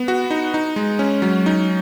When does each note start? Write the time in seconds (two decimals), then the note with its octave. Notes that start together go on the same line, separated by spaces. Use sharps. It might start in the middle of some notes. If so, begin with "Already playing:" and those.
Already playing: B3
0.08 F#4
0.31 D#4
0.54 D#4
0.76 G#3
0.99 C#4
1.22 F#3
1.46 D#4